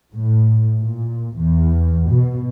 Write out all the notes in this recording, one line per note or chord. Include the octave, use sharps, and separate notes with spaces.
A2
A#2
E2
B2